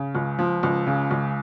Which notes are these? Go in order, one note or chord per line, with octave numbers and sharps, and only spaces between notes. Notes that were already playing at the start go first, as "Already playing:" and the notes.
Already playing: C#3
C#2
F3
C#2
C#3
C#2